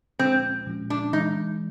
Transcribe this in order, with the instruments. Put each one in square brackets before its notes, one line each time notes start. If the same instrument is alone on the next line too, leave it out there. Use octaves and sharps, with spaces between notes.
[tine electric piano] A#2 F3 G#3 C#4 F4 [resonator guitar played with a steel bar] C4
[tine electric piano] A#2 F3 G#3 C#4 F4
[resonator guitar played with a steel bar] D4
[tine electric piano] E3 G#3 [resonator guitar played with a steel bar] D#4